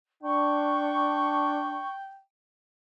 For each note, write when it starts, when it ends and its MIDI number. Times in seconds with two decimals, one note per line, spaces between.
0.23 1.84 62
0.23 2.20 79
0.23 1.92 85